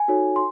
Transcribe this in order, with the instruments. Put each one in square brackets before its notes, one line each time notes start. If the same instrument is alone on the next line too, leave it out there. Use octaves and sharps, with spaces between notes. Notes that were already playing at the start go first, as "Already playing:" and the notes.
Already playing: [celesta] G#5
D#4 F#4 A4 C#5
C6